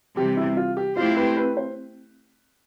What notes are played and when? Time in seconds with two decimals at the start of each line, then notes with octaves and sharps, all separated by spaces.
0.17 C3 E3 G3 G4
0.37 E4
0.57 F4
0.77 G4
0.97 A3 C4 E4 F4 G4 C5
1.17 B4
1.37 B4
1.57 C5